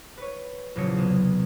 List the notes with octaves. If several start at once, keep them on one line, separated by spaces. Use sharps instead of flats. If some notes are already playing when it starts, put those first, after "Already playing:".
B4 C#5
A#1 E2 C#3 F#3 C#5 C#7
C2 C3 B3